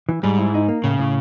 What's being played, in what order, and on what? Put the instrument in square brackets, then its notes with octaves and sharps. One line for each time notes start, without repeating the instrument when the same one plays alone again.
[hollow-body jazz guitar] E3
[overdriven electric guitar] G#2 [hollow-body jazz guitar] G3
[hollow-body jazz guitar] E4
D#4
A#3
[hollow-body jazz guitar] A2 [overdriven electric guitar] C#3
[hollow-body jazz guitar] A2